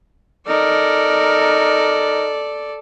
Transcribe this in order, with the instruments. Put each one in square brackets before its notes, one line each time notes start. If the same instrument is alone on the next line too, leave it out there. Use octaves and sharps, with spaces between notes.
[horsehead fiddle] D#4 A#4 [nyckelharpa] A4 D5